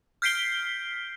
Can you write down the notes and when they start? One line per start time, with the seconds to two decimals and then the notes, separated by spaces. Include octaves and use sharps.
0.22 F6 G6 B6 C7 D7 G7